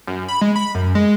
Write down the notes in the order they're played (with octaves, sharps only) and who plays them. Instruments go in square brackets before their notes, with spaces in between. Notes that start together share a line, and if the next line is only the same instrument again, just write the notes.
[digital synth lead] F#2
B5
G#3
B5
F#2
G#3